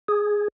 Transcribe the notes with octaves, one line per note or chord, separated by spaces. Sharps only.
G#4